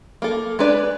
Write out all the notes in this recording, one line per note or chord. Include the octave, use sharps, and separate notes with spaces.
A#3 A4
G#3 D4 B4 D5